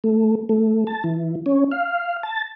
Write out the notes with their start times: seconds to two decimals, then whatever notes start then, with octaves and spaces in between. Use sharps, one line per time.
0.04 A3
0.49 A3
0.87 A5
1.04 E3
1.46 C#4
1.71 F5
2.23 A5